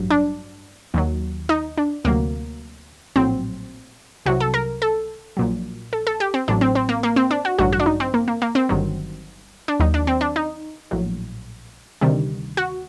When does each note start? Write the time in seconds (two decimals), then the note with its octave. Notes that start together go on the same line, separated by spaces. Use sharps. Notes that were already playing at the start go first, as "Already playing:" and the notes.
Already playing: A1 G2 F#3
0.10 D4
0.94 D#2 D#3 F#3
1.49 D#4
1.78 D4
2.05 D2 C3 F#3 A#3
3.16 A#1 A2 F#3 C4
4.26 C2 C3 F#3 F#4
4.40 A4
4.54 A#4
4.82 A4
5.37 A#1 A#2 F#3
5.93 A4
6.07 A4
6.20 G4
6.34 C4
6.48 A1 A2 F#3 D4
6.61 C4
6.75 C4
6.89 A#3
7.03 A#3
7.16 C4
7.31 D4
7.45 F#4
7.59 A1 G2 D3 F#3 F#4
7.73 F#4
7.80 D4
7.86 D#4
8.00 C4
8.14 A#3
8.28 A#3
8.42 A#3
8.55 C4
8.69 G1 G2 D#3 F#3
9.68 D4
9.80 D#2 D#3 F#3 D#4
9.94 D4
10.07 C4
10.21 D4
10.36 D#4
10.91 A#1 A2 F#3
12.01 D2 C3 D#3 G3
12.57 F#4